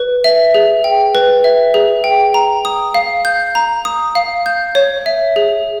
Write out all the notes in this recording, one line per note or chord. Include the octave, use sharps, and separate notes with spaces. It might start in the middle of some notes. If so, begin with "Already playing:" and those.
Already playing: B4
E5
G#4
G5
B4
E5
G#4
G5
A#5
D#6
F5
G6
A#5
D#6
F5
G6
C#5
E5
G#4